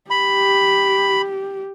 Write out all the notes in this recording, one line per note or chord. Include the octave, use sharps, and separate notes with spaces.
G4 B5